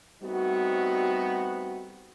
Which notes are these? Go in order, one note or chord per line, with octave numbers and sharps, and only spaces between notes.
G3 A3 B3 C4 D#4 F#4